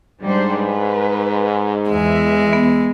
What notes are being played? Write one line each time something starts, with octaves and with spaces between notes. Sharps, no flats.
G#2 G3 D4 C5
B4
E2 G#3 E5
B3